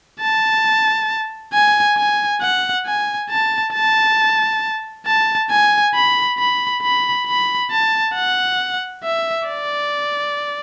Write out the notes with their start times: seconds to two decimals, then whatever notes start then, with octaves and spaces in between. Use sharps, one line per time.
0.21 A5
1.53 G#5
1.97 G#5
2.41 F#5
2.86 G#5
3.30 A5
3.74 A5
5.06 A5
5.50 G#5
5.95 B5
6.39 B5
6.83 B5
7.27 B5
7.71 A5
8.15 F#5
9.04 E5
9.48 D5